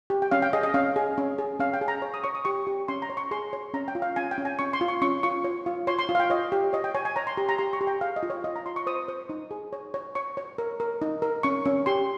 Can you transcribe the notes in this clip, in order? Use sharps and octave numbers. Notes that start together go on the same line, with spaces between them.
G4
G5
C#4 F5
G5
G#4 D#5
D#5
C#4 F5
G#4
C#4
G#4
C#4 F5
G5
G#4
A#5
C#5
D#6
C#5 C#6
D#6
G4 C#6
G4
C#4 C6
A#5
C#5
C#6
G#4 C6
C#5
C#4 A#5
G5
F4
F5
C#4 G#5
G5
C#4
G#5
C#4 C#6
C6
F4
C#6
C#4 C#6
F4 C#6
C#5
F4
C#5 C6
C6
F4
F5
G5
C#5 D#5
G4
C#5 D#5
G5
C#5 G#5
G#5
C#5 A#5
C6
G4 A#5
A#5
G4 C6
C#6
G4
G5
G#4 F5
D#5
F4
C#5
F4 D#5
A#5
F4 C6
C#6
C5 D#6
C5
D#4
G#4
C#5
C#5
C#5 C#6
C#5
A#4
A#4
D#4
A#4
C#4 C#6
C#4
G4 C6